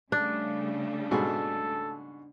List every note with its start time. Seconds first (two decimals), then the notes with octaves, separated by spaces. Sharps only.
0.12 C#3 G3 A3 D4
1.11 G#2 B2 G#4 A4